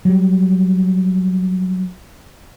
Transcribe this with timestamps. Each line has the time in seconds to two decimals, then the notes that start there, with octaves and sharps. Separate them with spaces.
0.05 F#3 G3